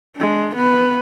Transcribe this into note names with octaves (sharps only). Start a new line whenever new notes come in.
G#3 D4
B3 B4